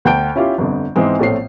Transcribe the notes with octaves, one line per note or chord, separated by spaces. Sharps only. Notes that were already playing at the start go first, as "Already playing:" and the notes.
D2 F#5 G5 A5 G6 D7
C#4 E4 F4 G4
G1 F2 D3
G#2 E3 G#3 C4
A#1 A2 A3 C4 C#5 C7